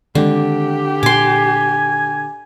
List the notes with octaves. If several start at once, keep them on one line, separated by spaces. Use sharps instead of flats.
D3 D#3 G#3 C4 G4
A#2 G#5 C6 D6